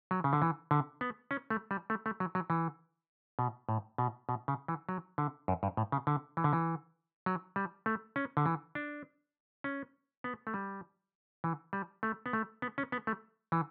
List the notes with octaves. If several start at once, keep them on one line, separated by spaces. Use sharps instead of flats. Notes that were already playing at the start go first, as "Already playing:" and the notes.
F#3
C#3
D3
E3
D3
B3
C#4
A3
G3
A3
A3
F#3
F#3
E3
B2
A2
B2
B2
C#3
E3
F#3
D3
F#2
G2
A2
C#3
D3
E3
D3
E3
F#3
G3
A3
C#4
D3
E3
D4
C#4
B3
A3
G3
E3
G3
A3
B3
A3
B3
C#4
B3
A3
E3